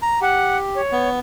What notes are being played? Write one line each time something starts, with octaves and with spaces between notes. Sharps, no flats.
A#5
G4 F#5
C#5
B3